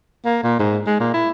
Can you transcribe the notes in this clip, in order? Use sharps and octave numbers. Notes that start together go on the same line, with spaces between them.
A#3
A#2
G#2
G#3
A#2
E4